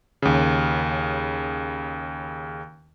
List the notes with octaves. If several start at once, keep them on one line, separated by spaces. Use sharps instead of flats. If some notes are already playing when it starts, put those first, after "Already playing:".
D#2 C#3